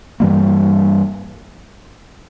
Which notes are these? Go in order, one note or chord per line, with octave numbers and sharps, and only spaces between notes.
G2 E3 G3 A#3